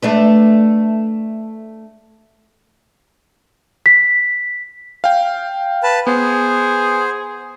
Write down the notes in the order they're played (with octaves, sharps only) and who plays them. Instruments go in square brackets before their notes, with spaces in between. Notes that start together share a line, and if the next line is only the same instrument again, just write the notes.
[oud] A3 D4 B4
[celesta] B6
[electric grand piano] F5 G5
[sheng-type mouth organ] B4 A5
[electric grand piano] B3 [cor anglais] G#4 [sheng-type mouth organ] C5